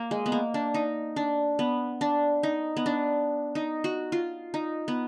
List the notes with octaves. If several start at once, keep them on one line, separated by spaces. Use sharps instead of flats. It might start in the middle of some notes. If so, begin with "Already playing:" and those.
Already playing: A#3
G#3
B3
A#3
D4
D#4
D4
B3
D4
D#4
B3
D4
D#4
F#4
F4
D#4
B3